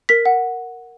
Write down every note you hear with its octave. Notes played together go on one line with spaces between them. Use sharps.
A#4 B6
F#5